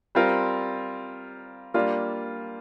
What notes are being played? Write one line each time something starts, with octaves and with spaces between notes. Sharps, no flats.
G3 C4 F4 A#4
G3 A#3 D4 F4